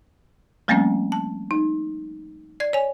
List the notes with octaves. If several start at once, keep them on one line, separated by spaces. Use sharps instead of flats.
F3 G3 A3 A#3 C4 C#4
A5
D#4
D5 G#6
C#5 G#5